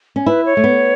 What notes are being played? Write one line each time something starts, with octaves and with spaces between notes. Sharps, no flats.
C#4
E4 B4
C#5
A3
B3